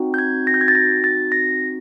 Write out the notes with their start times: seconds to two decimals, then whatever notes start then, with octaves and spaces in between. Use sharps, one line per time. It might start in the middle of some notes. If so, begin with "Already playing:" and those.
Already playing: C4 D#4 F#4
0.14 G6
0.18 G#6
0.47 A#6
0.54 G6
0.61 G#6
0.68 A6
0.75 A#6
1.04 A6
1.32 A#6